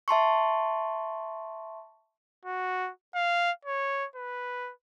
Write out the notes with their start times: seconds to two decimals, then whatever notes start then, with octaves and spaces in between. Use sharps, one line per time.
0.08 E5 A5 C6 C#6
2.45 F#4
3.15 F5
3.65 C#5
4.16 B4